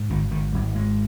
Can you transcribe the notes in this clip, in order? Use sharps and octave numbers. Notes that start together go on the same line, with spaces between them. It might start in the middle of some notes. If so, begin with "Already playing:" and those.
Already playing: G#2
G#1 D#3
G#2 D#3
G#1 G3
G#1 G#3